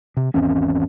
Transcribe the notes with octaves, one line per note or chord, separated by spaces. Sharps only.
C3
G#1 E2 C4 C#4